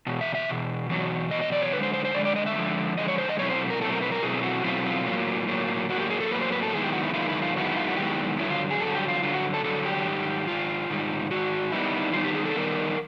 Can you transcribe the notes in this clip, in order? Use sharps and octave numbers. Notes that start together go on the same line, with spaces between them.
E2 B2
E5
E5
E2 B2
E2 B2 F#3
E2 B2 F#3 D#5
D#5
D5
C#5
D3 F3 G#3 B4
C5
C5
C5
D3 F3 G#3 D5
D5
D#5
E5
D3 F3 G#3
D3 F3 G#3 D#5
C#5
C5
D#5
B2 F#3 A3 C4 E4 C#5
C5
A#4
B2 F#3 A3 C4 E4 A4
A#4
B4
A#4
B2 F#3 A3 C4 E4 G#4
F#4
B2 F#3 A3 C4 E4 F4
F4
A2 F#3 A#3
A2 F#3 A#3
A2 F#3 A#3 F#4
G4
G#4
A4
A2 F#3 A#3 B4
C5
B4
A4
F#2 D#3 G#3 B3 E4 G#4
G4
F#4
E4
F#2 D#3 G#3 B3 E4 F4
E4
F4
F#2 D#3 G#3 B3 E4 F#4
F#4
F4
F#4
F#2 D#3 G#3 B3 E4 G4
G2 D3 F#3 E4
F4
G#4
G2 D3 F#3 A4
G#4
G4
F4
G2 D3 F#3 F4
F#4
A4
G2 D3 F#3 A4
G4
G#2 D#3 G3
G#2 D#3 F4
G#2 D#3 G3
G#2 D#3 F#4
D#3 G3 B3 D#4 E4
D#3 G3 B3 D#4 F4
G4
G#4
A4
D#3 G3 B3 D#4 A#4